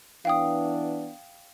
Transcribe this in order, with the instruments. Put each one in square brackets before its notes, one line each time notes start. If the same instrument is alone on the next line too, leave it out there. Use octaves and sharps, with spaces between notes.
[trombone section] E3 B3 D4 [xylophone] F5 G5 D#6